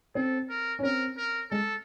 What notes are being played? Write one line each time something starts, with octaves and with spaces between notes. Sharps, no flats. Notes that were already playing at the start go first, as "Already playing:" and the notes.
C4 A4
A#4
C#4
C4 A#4
A#4
G#3 A4